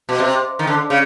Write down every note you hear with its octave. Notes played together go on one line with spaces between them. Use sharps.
B2
C3
D#3
D3
C#3